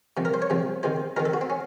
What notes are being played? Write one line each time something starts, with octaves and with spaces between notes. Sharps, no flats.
C2 C3 F3
A#4
C5
C#5
C2 C3 F3
C#2 C3 D#3 C5
C#2 C3 D#3 A#4
A4
F#4
C4
C#4